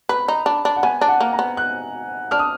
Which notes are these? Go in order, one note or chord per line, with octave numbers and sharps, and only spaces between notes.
B4 B5
D#4
D4
D4
F#5
B3 G#5
D4
F#5
A#3
A#5
B3
F#6
D4 F6
D#6